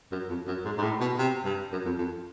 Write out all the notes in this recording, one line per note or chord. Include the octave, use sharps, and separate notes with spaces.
F#2
F2
F#2
G#2
G#2
A2
B2
C3
G2
F#2
F2
F2